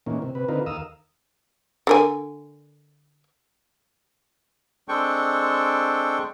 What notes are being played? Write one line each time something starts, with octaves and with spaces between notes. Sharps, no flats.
A#2 D#3 E3 A#3 C#4
C3
C3 B4
D3 C4 D#4 F4 A#4 B4
D#2 A#4 F5 D#6 E6
D3 A#4 G#5
G#3 C4 D4 A4 G5 C#6